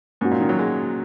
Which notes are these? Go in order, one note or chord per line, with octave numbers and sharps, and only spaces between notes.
G#2 A#3 C#4 F#4
A#2
D#3
F#3
G#3